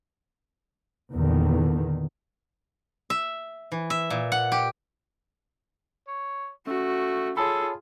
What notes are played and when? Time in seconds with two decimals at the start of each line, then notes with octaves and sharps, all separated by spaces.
1.13 E2 A#2 D3 D#3
3.10 E5
3.72 E3
3.90 E5
4.10 A#2
4.32 F#5
4.52 G4
6.08 C#5
6.67 A3 C#4 F#4
7.37 F4 G#4 A4 C#5 A5 B5